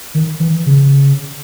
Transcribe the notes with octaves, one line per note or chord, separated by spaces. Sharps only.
D#3
E3
C#3